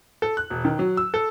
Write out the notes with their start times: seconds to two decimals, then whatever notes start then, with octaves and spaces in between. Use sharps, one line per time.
0.22 A4
0.37 F#6
0.50 E1
0.65 D#3
0.79 F#3
0.97 E6
1.14 A4